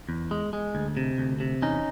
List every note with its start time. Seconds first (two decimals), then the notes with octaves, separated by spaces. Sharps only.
0.09 E2
0.31 G#3
0.53 G#3
0.75 D2
0.97 C3
1.18 D2
1.40 C3
1.62 E2 C#4 D#4